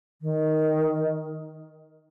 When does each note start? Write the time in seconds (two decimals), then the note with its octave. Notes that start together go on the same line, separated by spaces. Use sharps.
0.22 D#3